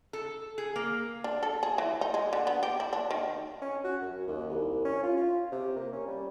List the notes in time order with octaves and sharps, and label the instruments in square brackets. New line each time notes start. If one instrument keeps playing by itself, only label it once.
[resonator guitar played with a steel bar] A4
G#4
A#3
[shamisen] D4
A4
G#4
E3
D#4
G#3
D3
B3
G4
E4
D4
D#3
[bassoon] C#4
F#4
F#2
D#2
C2
C#4
F4
F4
C3
A#3
C#4
G3